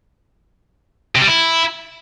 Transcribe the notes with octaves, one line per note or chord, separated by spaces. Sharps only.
C3
G3
E4